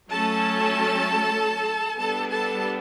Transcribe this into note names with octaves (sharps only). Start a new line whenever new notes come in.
F#3 A3 C#4 A4 A5
G3 B3 D4 A4 A5
A4 A5